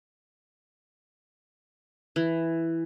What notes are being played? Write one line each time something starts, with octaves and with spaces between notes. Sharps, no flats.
E3